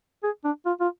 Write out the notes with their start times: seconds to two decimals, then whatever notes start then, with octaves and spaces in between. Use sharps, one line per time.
0.23 G#4
0.44 D4
0.66 F4
0.80 F4